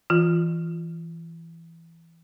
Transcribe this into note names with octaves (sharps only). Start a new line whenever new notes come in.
E3 F4